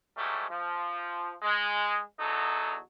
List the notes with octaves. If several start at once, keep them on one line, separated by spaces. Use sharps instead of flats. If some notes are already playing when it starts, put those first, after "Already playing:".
G#2 F#3 G3 A3
F3
G#3
E2 F#3 D#4 A4